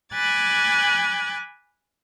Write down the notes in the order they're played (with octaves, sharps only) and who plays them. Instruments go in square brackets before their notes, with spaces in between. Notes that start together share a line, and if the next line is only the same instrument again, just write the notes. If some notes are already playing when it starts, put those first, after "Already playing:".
[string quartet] G#5 B5 D6 F#6 G#6 A6